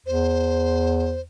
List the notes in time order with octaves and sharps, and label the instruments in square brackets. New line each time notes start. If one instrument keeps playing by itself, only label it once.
[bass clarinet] E2 [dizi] C5